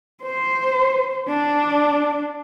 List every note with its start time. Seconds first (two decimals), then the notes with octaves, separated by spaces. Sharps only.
0.23 C5
1.28 D4